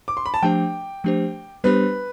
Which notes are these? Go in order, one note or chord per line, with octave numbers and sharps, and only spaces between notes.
D6
C6
B5
A5
F3 A3 D4 G4 C5 G5
F3 A3 D4 G4 C5
G3 B3 D4 G4 B4 C5